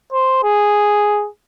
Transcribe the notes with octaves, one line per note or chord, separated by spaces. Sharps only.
C5
G#4